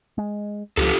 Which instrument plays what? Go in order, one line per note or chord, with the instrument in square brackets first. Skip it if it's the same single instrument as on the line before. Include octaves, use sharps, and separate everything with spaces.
[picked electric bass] G#3
[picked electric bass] C#2 F3 [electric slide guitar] F4 G4 A4